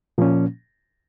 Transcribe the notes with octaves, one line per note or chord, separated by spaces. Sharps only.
A#2 F3 A#3 C#4